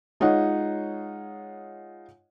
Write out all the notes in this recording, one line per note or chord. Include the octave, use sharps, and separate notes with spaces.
G#3 D#4 F4 C#5 D#5 F#5